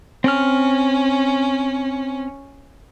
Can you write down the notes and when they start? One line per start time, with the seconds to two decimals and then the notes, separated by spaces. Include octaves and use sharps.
0.24 C4 C#4 F6